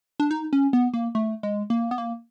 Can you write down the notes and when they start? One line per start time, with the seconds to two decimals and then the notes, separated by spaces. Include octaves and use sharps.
0.20 D4
0.31 D#4
0.53 C#4
0.73 B3
0.94 A#3
1.15 A3
1.43 G#3
1.70 A#3
1.91 B3
1.98 A#3